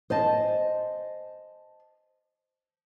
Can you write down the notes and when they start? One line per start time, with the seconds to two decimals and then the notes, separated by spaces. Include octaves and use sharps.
0.10 C5 D#5 G#5 A5